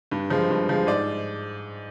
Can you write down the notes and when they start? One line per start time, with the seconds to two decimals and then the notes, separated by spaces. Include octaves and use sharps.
0.11 G2
0.30 F3 G#3
0.50 G2
0.69 F3 G#3
0.87 G#2 D5